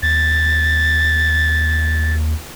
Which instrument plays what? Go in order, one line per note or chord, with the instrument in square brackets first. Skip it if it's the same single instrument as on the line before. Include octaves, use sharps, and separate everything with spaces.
[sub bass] D#2 [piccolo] A6